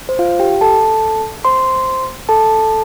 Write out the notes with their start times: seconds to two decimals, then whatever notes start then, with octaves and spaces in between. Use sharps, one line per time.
0.09 C5
0.19 F4 F5
0.40 G4 G5
0.61 A4 A5
1.45 C5 C6
2.29 A4 A5